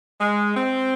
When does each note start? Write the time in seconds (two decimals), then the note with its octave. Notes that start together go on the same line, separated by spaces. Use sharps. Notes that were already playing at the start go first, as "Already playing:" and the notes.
0.21 G#3
0.57 C4